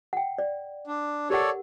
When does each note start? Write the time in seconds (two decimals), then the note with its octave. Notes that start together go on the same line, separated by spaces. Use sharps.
0.13 F#5 G5
0.39 D5
0.87 D4
1.30 G4 A4 A#4 C#5 D5 F#5